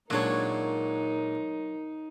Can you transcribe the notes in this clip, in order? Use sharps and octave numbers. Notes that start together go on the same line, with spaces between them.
A#2 F#3 G#3 D4 D#4 A#4 C#5